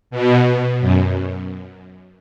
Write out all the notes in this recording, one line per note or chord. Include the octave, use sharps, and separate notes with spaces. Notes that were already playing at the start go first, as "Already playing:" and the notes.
B2
F#2